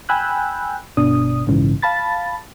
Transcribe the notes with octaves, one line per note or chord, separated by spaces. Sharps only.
G5 G#5 B5 E6 F#6 G6
G1 B2 D4 D#6
A#1 G#2 C#3 E3
F5 A5 B5 A6